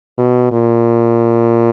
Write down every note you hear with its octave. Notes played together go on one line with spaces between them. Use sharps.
B2
A#2